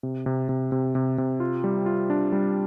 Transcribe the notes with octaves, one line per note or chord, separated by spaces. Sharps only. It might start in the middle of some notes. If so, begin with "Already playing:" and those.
C3
C3
C3
C3
C3
C3
F4
G3
F4
D4
G3